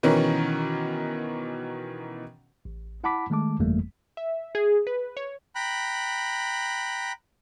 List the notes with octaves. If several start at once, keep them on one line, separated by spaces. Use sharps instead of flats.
B2 D#3 E3 C#4 A#4
A1
E4 F#5 A5 B5 D6 B6
D#3 G#3 A3 A5 D6
G1 F2 E3 G3 A3 A#3
E5
G#4
B4
C#5
G5 A#5 B5 F#6